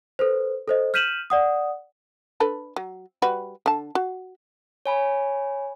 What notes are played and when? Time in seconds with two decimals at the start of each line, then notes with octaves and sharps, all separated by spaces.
0.19 A4 B4 C5
0.68 A4 C5 D#5
0.94 F6 G6 B6 D#7 E7 F#7
1.30 D5 F#5 D#6
2.40 D4 A4 B4
2.76 F#3
3.22 G3 F#4 B4
3.66 D3 A5
3.95 F#4
4.86 C#5 G#5 B5